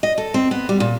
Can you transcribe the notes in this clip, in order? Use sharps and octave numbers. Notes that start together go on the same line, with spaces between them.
D#5
A4
C4
B3
G3
A#2